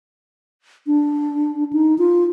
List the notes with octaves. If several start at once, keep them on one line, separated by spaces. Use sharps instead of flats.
D4
D#4
F4